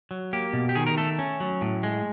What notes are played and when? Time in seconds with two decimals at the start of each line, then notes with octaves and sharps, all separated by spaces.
0.11 F#3
0.33 A#3 G4
0.53 B2
0.69 G4
0.75 D#3 G#4
0.86 A#4
0.97 A3 A4
1.19 C#4
1.40 F#3
1.61 A2
1.83 G#3